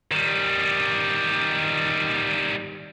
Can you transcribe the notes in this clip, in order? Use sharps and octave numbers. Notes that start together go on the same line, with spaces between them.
D#3 G3